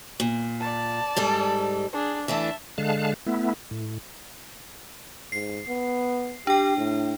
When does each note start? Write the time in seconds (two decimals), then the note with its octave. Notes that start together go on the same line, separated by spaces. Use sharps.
0.20 A#2
0.60 D5 A5
1.16 G#2 G3 A4
1.93 D4 G#4
2.28 E3 A3 D4 E5 A5
2.78 D3 G#3 F5 A5 F#6
3.26 A3 B3 E4
3.71 A2
5.32 G#2 C7
5.68 B3
6.47 D4 G4 G5
6.77 A2